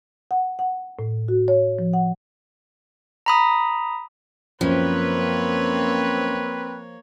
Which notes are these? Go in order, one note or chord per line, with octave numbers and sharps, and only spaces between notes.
F#5
F#5
A2
F#4
C#5
F3
F#5
A#5 B5 D#6
F#2 F3 A#3 C4 B4 C#5